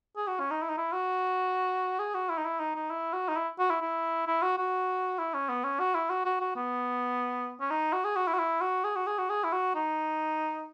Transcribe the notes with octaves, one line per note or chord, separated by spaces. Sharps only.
G#4
F#4
C#4
D#4
E4
D#4
E4
F#4
G#4
F#4
E4
D#4
E4
D#4
D#4
E4
F#4
D#4
E4
F#4
E4
E4
E4
F#4
F#4
E4
C#4
B3
C#4
F#4
E4
F#4
F#4
F#4
B3
C#4
D#4
F#4
G#4
F#4
E4
F#4
E4
F#4
G#4
F#4
G#4
F#4
G#4
E4
F#4
D#4